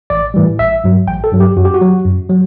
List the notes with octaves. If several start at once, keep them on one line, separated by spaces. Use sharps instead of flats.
A1 D5
A2 E3 G3
A1 E5
G2 F#3
A1 G5
A4
G2 F#3
G4
F#2 F#4
G4
F#4
F#3
F#2
F#3